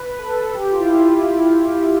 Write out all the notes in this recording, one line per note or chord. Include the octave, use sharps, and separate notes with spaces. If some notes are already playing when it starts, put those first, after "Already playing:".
Already playing: B4
B4
A4
A4
G4
F4
E4
F4